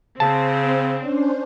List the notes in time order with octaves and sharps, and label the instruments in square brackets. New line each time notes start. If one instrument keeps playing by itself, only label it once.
[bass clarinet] C#3 [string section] C4 [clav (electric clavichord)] A5
[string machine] C#4 D4 C5